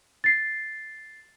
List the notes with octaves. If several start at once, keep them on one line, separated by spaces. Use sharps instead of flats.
A6 C7